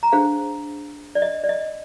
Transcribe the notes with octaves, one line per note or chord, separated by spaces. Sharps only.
A#5
D4 G#4 C5 F5 G#5
D5
D#5
D5
D#5